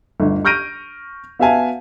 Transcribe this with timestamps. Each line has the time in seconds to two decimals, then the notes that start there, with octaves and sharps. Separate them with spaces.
0.20 G1 D2 D#4
0.45 C#6 F6 G6 A#6 D7 D#7
1.39 B3 F#4 E5 F5 G#5 A5